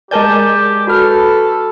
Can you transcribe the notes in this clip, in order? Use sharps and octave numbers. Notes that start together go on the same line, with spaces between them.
G#3 G4 A#4 D5 G#5 A5 G6
F#4 A4 B4 F6